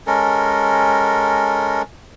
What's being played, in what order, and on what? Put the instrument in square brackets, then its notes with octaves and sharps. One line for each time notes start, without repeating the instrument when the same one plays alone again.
[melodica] G#3 C#4 A4 A#4